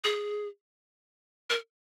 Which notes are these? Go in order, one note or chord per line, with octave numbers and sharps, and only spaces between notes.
G#4
A#4